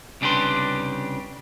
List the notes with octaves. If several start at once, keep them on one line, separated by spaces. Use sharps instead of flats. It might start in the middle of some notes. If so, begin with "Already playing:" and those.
C2 C#3 D4 G4 B4 C6